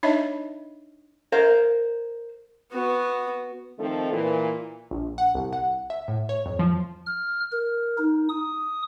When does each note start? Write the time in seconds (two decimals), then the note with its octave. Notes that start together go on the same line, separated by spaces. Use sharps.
0.03 D4 D#4 C#5 D#5 E5
1.32 A#4 C5 F5
2.72 B3 F#4
3.78 D#3 F3 A3 C4 D#4 A4
4.12 A#2 E3
4.91 A#1
5.18 F#5
5.35 C2
5.53 F#5
5.90 E5
6.08 A2
6.29 C#5
6.46 F2
6.59 F3
7.06 F6
7.52 A#4
7.98 D#4
8.29 D#6